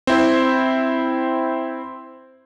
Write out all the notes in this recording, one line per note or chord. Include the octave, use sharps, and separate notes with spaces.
C4 E4 C5